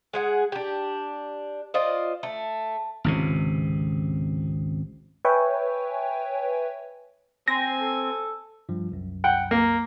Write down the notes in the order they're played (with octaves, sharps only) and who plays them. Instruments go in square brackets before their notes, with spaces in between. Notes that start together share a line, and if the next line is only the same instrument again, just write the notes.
[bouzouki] G#3 G#4 F#5
D4 G4
F4 C5 D5 D#5
A3
[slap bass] G#1 C#2 C3
[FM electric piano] B4 C#5 E5 G5 G#5
[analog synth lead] C4 [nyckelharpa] G#5 [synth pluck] A#6
[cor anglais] A4
[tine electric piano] G2 F3
C2 F#2
[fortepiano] F#5 G5
A#3